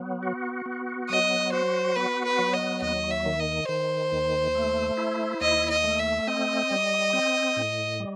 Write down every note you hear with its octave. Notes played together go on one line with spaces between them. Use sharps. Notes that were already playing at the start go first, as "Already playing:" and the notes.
Already playing: F#3 B3
F#4
B3
F#3 D#5
F#4 C5
B3 B4
B4
F#3
D#5
D#2 D#5
E5
D#3
D#5
D#3 C5
D#2
A3
E4
D#2 D#5
D#5
A3
E5
C4 D#5
G3
C4
A2
G3